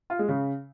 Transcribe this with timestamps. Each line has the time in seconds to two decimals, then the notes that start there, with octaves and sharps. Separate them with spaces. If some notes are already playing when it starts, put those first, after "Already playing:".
0.10 F4
0.19 G#3
0.29 C#3